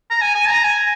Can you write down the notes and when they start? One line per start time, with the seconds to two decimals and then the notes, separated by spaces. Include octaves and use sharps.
0.10 A#5
0.21 G#5
0.35 G#5
0.49 A#5
0.64 G#5